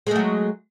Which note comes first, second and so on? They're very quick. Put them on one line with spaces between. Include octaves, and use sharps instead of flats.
G#3 A3 F#3